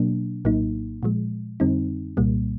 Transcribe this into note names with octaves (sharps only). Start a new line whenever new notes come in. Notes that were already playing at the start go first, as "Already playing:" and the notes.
Already playing: B2 F#3 A#3 D4
A#1 A2 F#3 A#3 D#4
A#2 F3 G#3
F2 D3 G3 C4 D#4
C2 A#2 G3 A#3